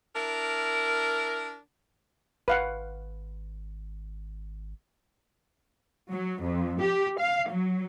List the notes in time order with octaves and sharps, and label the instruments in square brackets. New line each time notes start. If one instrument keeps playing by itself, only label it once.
[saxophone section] D4 E4 A#4
[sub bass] G#1 [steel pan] B4 F5 F#5
[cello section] F#3
F2
G4
F5
F#3